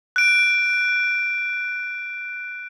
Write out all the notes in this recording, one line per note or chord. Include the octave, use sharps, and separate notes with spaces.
F#6 D7